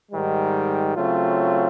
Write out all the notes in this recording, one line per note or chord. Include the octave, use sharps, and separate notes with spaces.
G#2 D#3 G3
C#3 F#3 A3 C4 F4